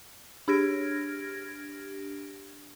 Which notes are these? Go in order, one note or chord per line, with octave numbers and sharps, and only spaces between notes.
D4 G4 F6 G#6 A#6 D7